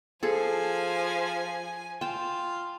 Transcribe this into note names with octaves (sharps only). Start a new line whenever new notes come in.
F3 G#4 A4 G#5
F4 G5 A5